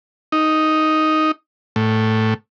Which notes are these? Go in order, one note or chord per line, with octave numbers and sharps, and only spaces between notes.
D#4
A2